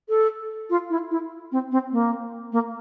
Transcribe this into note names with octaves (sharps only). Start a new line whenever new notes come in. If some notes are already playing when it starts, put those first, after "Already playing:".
A4
F4
E4
E4
C4
C4
A#3
A#3